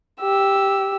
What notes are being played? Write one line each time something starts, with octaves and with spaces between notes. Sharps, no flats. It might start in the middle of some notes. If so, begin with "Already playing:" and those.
G4 E6